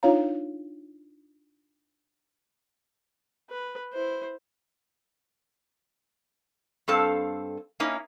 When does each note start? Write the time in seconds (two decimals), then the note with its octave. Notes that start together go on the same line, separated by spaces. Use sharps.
0.03 D4 D#4 F4 C#5 F5 A#5
3.50 B4
3.93 E4 C5
6.88 G2 C4 A4 F5
7.80 A#3 C#4 D#4 E4